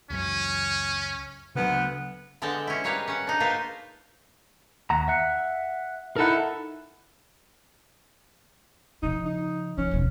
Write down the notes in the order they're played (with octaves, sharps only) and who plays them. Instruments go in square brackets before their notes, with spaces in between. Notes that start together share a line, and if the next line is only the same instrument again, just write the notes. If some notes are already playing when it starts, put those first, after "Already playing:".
[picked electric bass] C#2 F#2 [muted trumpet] C#4
[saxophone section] D2 B3 [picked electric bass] C#3 F#3
[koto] D3 G#3 B3 D5 G5 A5
C#4 E4
G3 A#3 G#4 B4 C#5 F5
C#4 F#5
D4 D#4
A#3 F4 B4 C5
[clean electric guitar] D#2 F#5 A#5
E5 F#5
[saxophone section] D#4 E4 A4 [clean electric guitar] A#4 F#5
[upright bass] C#3 F3 [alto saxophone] D#4
[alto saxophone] D#4
[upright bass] F3 [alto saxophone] C#4
[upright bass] E1 F2